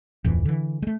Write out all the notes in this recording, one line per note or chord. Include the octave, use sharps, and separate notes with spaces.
D1 F2 E3
D3 E3
G#3 A3